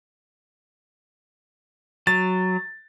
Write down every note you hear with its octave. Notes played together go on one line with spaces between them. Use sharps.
F#3 A6